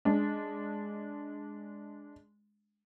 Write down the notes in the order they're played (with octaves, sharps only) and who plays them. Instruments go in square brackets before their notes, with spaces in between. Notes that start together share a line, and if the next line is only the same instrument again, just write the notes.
[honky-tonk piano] G#3 D4